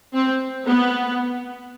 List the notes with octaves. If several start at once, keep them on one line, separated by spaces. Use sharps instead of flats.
C4
B3